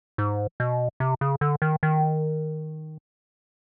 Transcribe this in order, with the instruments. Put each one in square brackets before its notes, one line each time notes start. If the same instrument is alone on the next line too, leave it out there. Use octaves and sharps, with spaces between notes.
[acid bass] G#2
B2
C3
C#3
D3
D#3
D#3